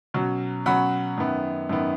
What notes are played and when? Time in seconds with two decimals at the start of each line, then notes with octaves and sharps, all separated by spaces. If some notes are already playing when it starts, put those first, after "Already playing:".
0.14 B2 F#3 C#4
0.66 B2 F#3 C#4 F#5 B5
1.18 F#2 D#3 B3
1.69 F#2 D#3 B3